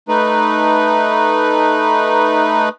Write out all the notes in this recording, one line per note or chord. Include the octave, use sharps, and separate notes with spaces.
A3 D#4 B4